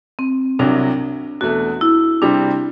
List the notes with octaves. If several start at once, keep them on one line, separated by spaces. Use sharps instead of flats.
C4
C2 C3 F#3 D4
E2 B2 A3 F#4
E4
C3 G3 C4 D4